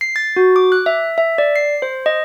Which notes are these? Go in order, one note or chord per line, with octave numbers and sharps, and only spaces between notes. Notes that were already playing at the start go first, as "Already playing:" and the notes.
C7
A6
F#4
D6
F#6
E5
E5
D5
C7
C5
D#5